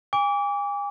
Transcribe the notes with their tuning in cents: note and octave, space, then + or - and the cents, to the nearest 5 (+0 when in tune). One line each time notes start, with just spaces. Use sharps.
G#5 -40 D6 -30